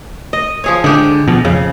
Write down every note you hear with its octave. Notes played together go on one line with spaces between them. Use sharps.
D#5
F3 G#4 C#5
D3 G#3 G4
B2 F3
F2 C#3